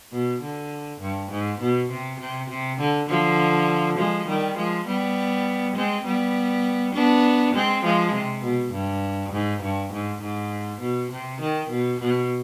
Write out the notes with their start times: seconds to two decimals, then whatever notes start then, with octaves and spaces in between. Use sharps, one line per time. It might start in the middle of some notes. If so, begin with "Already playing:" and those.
0.12 B2
0.42 D3
1.01 G2
1.31 G#2
1.60 B2
1.90 C3
2.20 C3
2.50 C3
2.80 D3
3.09 D3 F3
3.98 F3 G#3
4.27 D#3 G3
4.57 F3 G#3
4.86 G3 B3
5.76 G#3 C4
6.06 G3 B3
6.94 B3 D4
7.54 G#3 C4
7.84 F3 G#3
8.14 C3
8.43 B2
8.73 G2
9.33 G#2
9.62 G2
9.92 G#2
10.22 G#2
10.81 B2
11.11 C3
11.40 D#3
11.70 B2
12.00 B2